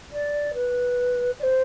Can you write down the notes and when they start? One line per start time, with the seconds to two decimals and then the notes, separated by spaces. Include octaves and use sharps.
0.12 D5
0.54 B4
1.40 D5
1.43 C5